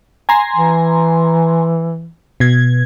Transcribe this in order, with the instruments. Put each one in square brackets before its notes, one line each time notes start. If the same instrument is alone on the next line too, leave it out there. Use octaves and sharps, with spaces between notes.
[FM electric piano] G#5 A#5 C6
[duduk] E3
[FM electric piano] B2 G#6